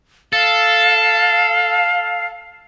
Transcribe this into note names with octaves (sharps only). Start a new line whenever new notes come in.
A4 F5